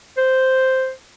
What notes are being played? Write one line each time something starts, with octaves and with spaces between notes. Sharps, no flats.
C5